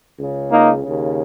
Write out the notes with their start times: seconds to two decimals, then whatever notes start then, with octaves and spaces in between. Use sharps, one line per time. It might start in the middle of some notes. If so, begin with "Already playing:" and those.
0.18 C#2 C#3
0.50 A#3 D#4
0.82 D#2 C#3